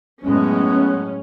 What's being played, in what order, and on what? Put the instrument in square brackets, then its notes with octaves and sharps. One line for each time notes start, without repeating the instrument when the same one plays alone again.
[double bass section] F#2 A2 G#3 [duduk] B3 [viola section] C#4